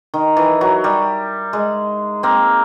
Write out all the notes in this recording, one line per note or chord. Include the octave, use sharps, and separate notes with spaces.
D#3
E3
F#3
G3
G#3
A#3 C4